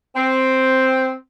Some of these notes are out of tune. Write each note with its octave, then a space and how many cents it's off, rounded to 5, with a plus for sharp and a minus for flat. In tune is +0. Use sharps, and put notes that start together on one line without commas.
C4 +0